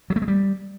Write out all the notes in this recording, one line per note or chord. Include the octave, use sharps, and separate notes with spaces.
F#3
A3
G#3
G3